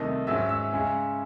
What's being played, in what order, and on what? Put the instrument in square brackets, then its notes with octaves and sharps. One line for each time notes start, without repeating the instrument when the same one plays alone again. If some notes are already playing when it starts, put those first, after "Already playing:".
Already playing: [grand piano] C2 C3 D#3 A3 D#4
G#2 F#3 C#4 E5 E6
E5 E6
C#3 G#3 C#4